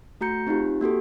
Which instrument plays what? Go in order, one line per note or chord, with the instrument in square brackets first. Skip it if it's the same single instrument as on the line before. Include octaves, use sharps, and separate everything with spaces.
[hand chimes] A3 F#4 A#5 G6 C#7
C4 D#4 F4 G4
A#3 F#4 G4 A4